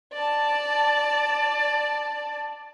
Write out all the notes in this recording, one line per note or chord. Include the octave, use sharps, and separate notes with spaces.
D5 A5